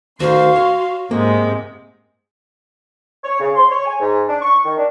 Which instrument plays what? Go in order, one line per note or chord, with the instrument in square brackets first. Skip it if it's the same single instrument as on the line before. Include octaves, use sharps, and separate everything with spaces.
[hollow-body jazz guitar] D2 D#3 [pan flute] F#4 [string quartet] F5 C6
[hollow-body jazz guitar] C#5
[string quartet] G#2 C3 G#3 [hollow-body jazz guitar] A#3
[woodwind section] C#5
C#3
C6
C#5
G#5
G#2
D4
C#6
D#3
D4